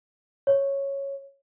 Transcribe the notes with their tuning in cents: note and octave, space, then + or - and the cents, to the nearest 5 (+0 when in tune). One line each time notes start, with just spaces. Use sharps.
C#5 -5